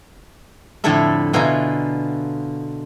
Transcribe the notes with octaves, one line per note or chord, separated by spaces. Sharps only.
F2 A2 D3 E4 A4 E5
B2 D3 E4 F4 G#5 A#5